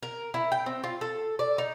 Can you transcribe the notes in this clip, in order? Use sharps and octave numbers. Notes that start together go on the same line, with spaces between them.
A#4
E4
G5
C4
F4
A4
D5
D#4